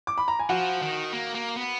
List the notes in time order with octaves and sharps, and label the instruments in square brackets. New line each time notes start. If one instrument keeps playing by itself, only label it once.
[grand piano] D6
B5
A#5
G#5
[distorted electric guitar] F3 [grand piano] F#4 F#5
[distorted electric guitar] D#3
A#3
A#3
B3